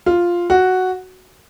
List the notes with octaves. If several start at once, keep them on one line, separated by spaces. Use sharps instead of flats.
F4
F#4